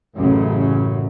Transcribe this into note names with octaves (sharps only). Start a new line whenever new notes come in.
A1 F#2 C#3